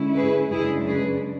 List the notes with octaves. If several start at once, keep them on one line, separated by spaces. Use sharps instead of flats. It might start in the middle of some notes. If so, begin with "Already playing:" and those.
Already playing: D3 G#3 C#4 E4
G#4 B4
F#2 C#3 G#3 D4 E4 G#4
G#4 B4